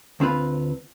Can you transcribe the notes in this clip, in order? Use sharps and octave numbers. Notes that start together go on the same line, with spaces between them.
D2 C4 F4 B4